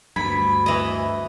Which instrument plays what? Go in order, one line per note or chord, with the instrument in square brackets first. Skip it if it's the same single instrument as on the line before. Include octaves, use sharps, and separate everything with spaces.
[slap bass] D2 [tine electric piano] G2 G#6 [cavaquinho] B5
[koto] E3 D#5